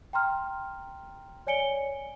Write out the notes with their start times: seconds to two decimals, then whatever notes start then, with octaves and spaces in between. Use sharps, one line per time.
0.13 G5 A#5 C6 F6
1.47 C#5 D5 G#5 C#7 D7 G7